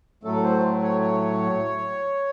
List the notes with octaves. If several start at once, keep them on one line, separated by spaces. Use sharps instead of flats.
A2 F#3 A3 A4
C5
C#5
C#5